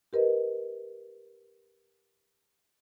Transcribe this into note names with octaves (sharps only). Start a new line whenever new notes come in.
G4 A#4 B4 D#5